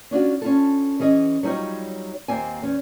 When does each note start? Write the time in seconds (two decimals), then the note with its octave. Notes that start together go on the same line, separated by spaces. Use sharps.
0.11 C#4 D4 F4 F#4
0.42 C#4 F4 A4
1.00 E3 C#4 G#4 D#5
1.43 F#3 G3 D#4 F4 C#5
2.28 D#2 A#3 C4 F4 G#5
2.62 E2 C#4